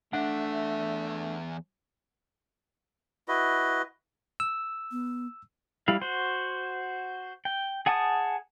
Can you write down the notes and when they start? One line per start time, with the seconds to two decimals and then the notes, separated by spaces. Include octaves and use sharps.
0.13 E2 A3 D4 E5 F#5
3.28 E4 F#4 B4 D#5
4.40 E6
4.91 B3
5.88 G3 E4 F5
6.01 F#4 C5
7.45 G5
7.86 G#4 F#5 G#5 A5 D#6